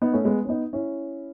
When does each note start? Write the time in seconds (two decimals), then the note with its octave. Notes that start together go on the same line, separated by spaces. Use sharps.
0.02 B3 D#4
0.13 A3 C#4
0.25 G#3 B3
0.45 C#4
0.49 B3 D#4
0.73 C#4 E4